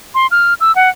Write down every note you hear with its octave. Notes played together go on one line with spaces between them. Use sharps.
C6
F6
E6
F#5